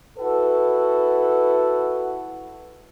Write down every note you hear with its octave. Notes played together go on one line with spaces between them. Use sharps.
E4 F#4 A4 B4 F#5